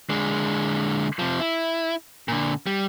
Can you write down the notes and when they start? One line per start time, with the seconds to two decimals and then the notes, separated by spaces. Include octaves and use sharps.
0.10 D3 G#3
1.19 C3 F3
1.40 E4
2.28 A#2 D3
2.67 G3